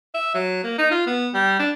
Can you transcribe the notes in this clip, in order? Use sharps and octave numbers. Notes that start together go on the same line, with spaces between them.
E5
F#3
A#3
D#4
F4
B3
G3
D4